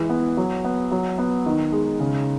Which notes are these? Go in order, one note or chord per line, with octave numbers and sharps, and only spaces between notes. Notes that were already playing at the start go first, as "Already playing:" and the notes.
Already playing: E3 G#3
B3
F#3
B3
F#3
B3
D#3
G#3
C#3